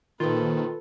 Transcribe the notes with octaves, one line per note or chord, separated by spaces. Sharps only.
A#2 D#3 F3 A#3 F4 A4 B4